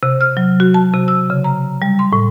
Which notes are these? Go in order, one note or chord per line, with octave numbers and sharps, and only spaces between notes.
C3
F6
F#3
F#4
A5
C3
E6
C#3
A#5
G3
C6
A2